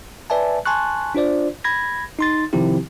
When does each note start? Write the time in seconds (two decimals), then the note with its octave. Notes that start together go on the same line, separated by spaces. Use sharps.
0.30 B4 D5 E5 G#5 A5
0.66 G#5 A5 C6 C#6 F#6
1.15 D4 F4 C5 D5
1.64 B5 G#6 A#6
2.19 D#4 C6 A6
2.53 C3 D#3 F3 C4 E4 G4